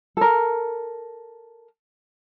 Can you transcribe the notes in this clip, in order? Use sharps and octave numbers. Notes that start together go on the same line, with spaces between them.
A4 A#4